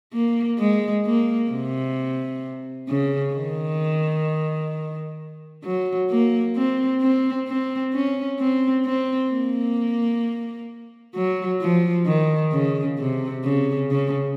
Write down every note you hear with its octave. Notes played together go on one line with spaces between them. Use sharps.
A#3
G#3
A#3
C3
C#3
D#3
F#3
A#3
C4
C4
C4
C#4
C4
C4
A#3
F#3
F3
D#3
C#3
C3
C#3
C#3